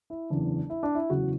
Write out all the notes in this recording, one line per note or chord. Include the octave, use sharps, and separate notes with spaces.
E4
F#1 E2 C#3 E3 D4
E4
D4
E4
F#1 E2 C#3 E3 F#4